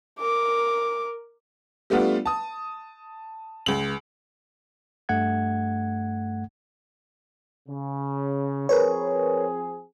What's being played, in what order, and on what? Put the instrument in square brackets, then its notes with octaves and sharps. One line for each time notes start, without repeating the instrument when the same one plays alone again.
[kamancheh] A#4 D6
[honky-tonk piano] G3 A3 B3 D4 F4
A5 D#6
C#2 F#7
[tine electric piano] G2 A3 F#5 G#6
[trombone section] C#3
[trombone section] F3 C4 G#4 [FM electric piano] A#4 B4 C#5